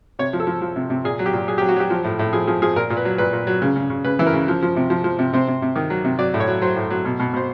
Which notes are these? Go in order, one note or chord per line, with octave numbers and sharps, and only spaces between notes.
C3 C#5
F3
A4
F3
F3
C3
C3
A#2 G#4
F#3
G4
A#2
F#3 G#4
F#3 G4
F#4
F#3 G4
F3
A2
A2
F3 G#4
F3 G#4
F3 G#4
A#2 A#4
A#2
B4
F#3
A#2 B4
A#2
F#3
C#3
C#3
C#3
C#3 B4
E3
A#4
C#3
F3
F3
C3
F3
F3
C3
C3 C5
C3
C3
D#3
F#3
C3
F#3 D5
A2
C#5
F#3
F#3 C5
A2
F#3
B2
B2
B2 C5